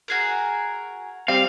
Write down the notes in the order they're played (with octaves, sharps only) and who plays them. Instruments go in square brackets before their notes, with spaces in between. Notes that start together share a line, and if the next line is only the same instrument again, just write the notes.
[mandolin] F#4 G#4 A#4
[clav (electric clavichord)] G3 C4 [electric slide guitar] F5